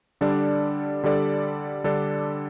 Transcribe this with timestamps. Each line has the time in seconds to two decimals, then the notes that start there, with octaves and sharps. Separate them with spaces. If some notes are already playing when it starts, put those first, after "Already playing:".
0.21 D3 G3 D4 A4 D5
1.03 D3 G3 D4 A4 D5
1.84 D3 G3 D4 A4 D5